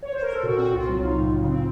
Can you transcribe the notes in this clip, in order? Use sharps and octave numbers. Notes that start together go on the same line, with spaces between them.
C#5
C5
A#4
A4
A#2 F#4
C4 F#4
C2 F4
F#3
D#4
A2
C#3
C4